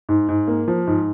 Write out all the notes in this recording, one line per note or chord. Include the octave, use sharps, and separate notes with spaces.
G#2
G#2
A#3
F3
G#2